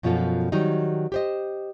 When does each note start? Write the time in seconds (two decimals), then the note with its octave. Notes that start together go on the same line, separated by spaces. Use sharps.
0.03 F#2 B2 F3 F4 A4
0.52 D#3 F#3 G3 D#4
1.12 G4 C5 D#5